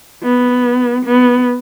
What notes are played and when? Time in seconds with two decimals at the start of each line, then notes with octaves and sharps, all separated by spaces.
0.23 B3
1.05 B3